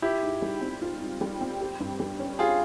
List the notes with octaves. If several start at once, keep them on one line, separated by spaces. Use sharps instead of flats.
E4 F4 G4
G#2
G3
C4
F4
G#2
G3
C4
G4
G2
G3
C#4
F4 G4 G#4